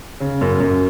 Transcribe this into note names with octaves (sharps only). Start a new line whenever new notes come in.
C#3
F#2
F#2